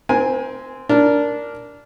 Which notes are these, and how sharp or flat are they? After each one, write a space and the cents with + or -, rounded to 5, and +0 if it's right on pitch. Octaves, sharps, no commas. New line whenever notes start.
C4 -10 A#4 +40 G#5 +0
D4 -15 A#4 +0